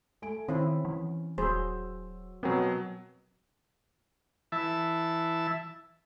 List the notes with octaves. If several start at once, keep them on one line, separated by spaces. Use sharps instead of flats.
A3 G#5 D7
D#3 C4 C#4 E4
E3
D#1 F#3 G#4 C5 E6
B2 F#3 B3 C4 A#4 G5 G#5
E3 E5 A5